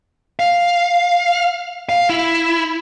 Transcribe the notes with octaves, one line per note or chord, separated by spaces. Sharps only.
F5
F5
E4